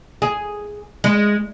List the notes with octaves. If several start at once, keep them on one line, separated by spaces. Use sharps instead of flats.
G#4
G#3